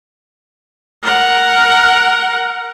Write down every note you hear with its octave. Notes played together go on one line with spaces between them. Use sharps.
A#4 F#5